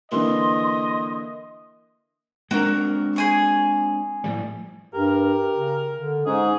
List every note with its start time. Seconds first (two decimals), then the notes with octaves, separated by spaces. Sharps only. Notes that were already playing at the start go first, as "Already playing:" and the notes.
0.12 D3 E3 A#3 D#5 C6
2.51 G#3 C4 D4 F#4 A#4
3.16 G#4 G#5 C#6
4.24 A2 F3 G3
4.94 G2 G4 A#4
5.55 C#3
5.95 D3
6.26 G#2 C#4 G#4